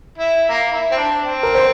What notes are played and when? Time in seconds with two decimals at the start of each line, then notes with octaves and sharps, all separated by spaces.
0.18 E4
0.49 A#3
0.72 E4
0.91 C4
0.96 D4
1.19 C4
1.43 A#4
1.55 C5